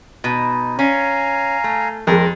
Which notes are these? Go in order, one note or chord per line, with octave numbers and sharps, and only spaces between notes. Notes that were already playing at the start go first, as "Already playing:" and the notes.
B2 D#4
C#4 F5 G#5 A#5
A3
F2 G#3 A#4